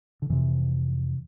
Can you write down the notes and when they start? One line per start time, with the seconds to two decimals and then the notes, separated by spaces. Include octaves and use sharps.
0.22 D3
0.30 F2 C3 E3